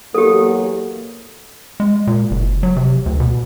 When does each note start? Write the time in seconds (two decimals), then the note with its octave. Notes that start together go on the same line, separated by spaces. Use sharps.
0.14 E2 F#3 A#3 G4 A4
1.80 G#3
2.07 A#2
2.31 F#1
2.63 F#3
2.76 C3
3.06 D2
3.20 B2